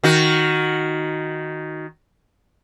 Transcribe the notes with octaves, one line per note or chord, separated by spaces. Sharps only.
D#3 F#4